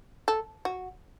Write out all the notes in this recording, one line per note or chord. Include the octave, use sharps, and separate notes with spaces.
A4
F#4